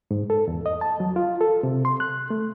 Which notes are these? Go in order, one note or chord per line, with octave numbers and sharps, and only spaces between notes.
G#2
A4
E2
D#5
A5
F#3
F4
A4
C3
C6
F#6
A3